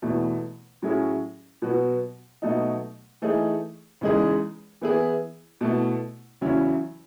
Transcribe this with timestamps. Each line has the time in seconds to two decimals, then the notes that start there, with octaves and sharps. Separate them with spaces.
0.02 E2 B2 A3
0.82 A2 F#3 C#4 E4 G#4
1.62 B2 F#3 B3 F#4
2.42 B2 F#3 A3 D#4
3.22 E3 A3 D#4 G#4
4.01 E2 C#3 G#3 D#4 G#4
4.81 E3 B3 E4 G#4
5.61 B2 A3 E4
6.41 E2 C#3 F#3 C#4 E4